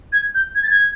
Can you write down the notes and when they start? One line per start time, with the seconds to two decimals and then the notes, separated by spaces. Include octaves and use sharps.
0.13 G#6
0.35 G6
0.55 G#6
0.63 A6
0.70 G#6